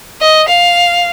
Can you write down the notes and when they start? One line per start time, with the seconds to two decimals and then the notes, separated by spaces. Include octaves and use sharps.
0.21 D#5
0.49 F5